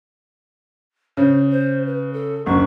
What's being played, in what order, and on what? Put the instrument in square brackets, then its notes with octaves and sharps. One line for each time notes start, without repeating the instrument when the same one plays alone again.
[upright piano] C#3 [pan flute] C5
[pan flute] C5
B4
A4
[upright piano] F#1 D2 [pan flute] C#6